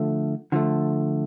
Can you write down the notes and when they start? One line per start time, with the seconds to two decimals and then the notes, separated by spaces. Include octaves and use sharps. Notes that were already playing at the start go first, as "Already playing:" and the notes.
Already playing: D3 F3 A3
0.52 D3 F3 A3